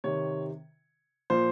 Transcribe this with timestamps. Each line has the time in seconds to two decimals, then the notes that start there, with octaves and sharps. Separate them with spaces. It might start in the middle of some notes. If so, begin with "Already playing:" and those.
0.04 C3 D#3 C#5
1.30 A#2 F3 C5